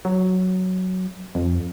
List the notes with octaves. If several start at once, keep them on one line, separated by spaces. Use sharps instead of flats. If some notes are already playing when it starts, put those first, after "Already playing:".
F#3
F2